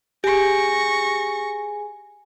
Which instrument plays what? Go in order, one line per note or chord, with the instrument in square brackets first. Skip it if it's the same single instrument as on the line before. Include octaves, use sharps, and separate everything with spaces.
[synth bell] G4 [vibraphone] G#4 G#5 [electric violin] C#6 A#6